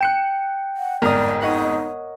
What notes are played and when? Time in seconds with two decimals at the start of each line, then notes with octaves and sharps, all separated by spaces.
0.01 G5 F#6 C#7 E7
0.77 F#5
1.02 G1 F2 G#2 A#4 D5 D#6
1.42 D#4 C#5 D#5 F#5